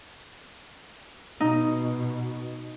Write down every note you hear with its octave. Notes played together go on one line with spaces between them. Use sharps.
B2 D#4